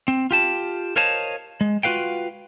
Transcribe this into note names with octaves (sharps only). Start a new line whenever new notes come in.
C4
F4 G4 A5
A#4 C5 C#5 D#5 F5 A5
G#3
F4 F#4 B4 F5 G5